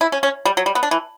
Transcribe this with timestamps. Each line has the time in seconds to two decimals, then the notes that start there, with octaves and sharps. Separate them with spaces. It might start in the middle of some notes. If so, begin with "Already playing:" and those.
0.01 E4
0.12 C#4
0.23 C#4
0.45 G3
0.57 F#3
0.66 G3
0.75 B3
0.83 D4
0.91 E3